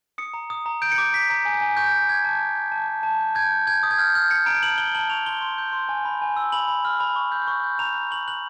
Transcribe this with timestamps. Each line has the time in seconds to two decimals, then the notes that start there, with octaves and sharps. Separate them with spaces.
0.18 D#6 C#7
0.34 A#5
0.50 D#6
0.66 A#5
0.82 G6 D7
0.92 C#7
0.98 D6
1.13 D6 B6
1.30 A#5
1.45 G#5
1.61 G#5
1.77 C#6 G6
1.93 G#5
2.09 D6 G#6
2.24 A5
2.40 A5
2.56 G6
2.72 A5
2.88 A5
3.03 A5
3.20 G6
3.35 G6 G#6
3.52 G6
3.67 G6 G#6
3.83 D#6
3.91 G#6
3.99 F6 G6
4.15 F6 G6
4.30 F6 C#7
4.46 A#5 D7
4.63 A5 F#7
4.78 F#6 G7
4.95 A5 F#7
5.10 C#6 F7
5.26 C6 G7
5.41 C6
5.58 G6
5.73 C6
5.89 G#5
6.05 B5
6.22 G#5
6.36 E6
6.52 B5 F#7
6.68 B5
6.85 F6
7.00 B5
7.16 C#6
7.32 G6
7.47 C#6
7.64 G6
7.79 A#5 F7
7.95 F#6
8.11 C#6 F#7
8.27 F#6 F#7